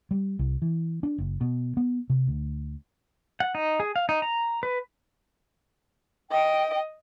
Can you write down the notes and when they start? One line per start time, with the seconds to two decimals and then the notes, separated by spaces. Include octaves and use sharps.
0.11 G3
0.39 C2
0.62 E3
1.03 D4
1.18 F#1
1.41 B2
1.77 B3
2.10 C3
2.27 D2
3.40 F#5
3.55 D#4
3.80 G#4
3.96 F5
4.09 D#4
4.22 A#5
4.63 B4
6.32 D#5 G5